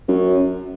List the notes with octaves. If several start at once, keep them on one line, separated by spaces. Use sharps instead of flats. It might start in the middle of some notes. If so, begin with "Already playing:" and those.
F#2